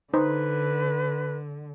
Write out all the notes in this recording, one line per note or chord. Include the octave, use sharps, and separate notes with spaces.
D3 D#4 B4 C5